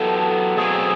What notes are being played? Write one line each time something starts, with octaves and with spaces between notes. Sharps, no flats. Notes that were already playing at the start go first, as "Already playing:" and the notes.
Already playing: F#3 B3 E4 G4 A4
B2 F#3 A3 C4 G#4